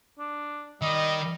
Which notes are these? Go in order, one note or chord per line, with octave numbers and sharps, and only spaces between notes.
D4
D#3 G3 D#5